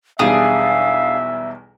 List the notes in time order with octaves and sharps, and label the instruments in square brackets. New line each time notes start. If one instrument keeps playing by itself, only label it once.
[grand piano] B1 E2 G3 [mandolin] D4 G#4 [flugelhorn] E5 [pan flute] F5